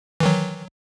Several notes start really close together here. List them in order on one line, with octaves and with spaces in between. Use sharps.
E3 D#3 F#3